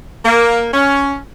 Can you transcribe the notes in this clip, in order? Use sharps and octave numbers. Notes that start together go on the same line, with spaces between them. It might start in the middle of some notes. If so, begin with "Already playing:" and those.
A#3
C#4